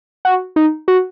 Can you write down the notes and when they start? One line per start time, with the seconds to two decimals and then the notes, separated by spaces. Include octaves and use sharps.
0.25 F#4
0.56 D#4
0.88 F#4